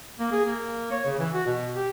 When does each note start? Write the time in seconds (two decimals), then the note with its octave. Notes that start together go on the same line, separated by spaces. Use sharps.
0.19 A#3
0.32 G#4
0.45 A#3
0.91 C#5
1.06 C#3
1.18 E3
1.34 F#4
1.47 B2
1.76 G4